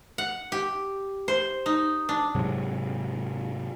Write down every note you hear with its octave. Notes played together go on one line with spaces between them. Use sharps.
F#5
G4
C5
D#4
D4
G#2 C3 F#3